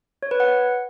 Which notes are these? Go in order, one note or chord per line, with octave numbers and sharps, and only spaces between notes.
C#5
B4
F#5